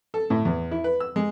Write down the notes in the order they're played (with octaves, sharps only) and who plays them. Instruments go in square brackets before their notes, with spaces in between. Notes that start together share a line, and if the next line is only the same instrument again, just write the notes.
[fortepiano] A4
A2
E2
E4
B4
E6
G#3